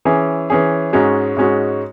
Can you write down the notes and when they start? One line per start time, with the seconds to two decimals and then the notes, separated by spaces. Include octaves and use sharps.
0.05 E3 C#4 G#4
0.50 E3 C#4 G#4
0.93 G#2 G#3 C#4 F#4
1.37 G#2 G#3 C#4 F#4